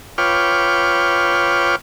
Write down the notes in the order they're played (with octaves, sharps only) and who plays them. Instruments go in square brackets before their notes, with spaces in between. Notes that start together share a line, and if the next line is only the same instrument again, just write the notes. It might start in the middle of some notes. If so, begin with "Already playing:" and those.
[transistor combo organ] F4 B4 C#5 G5 D6 F6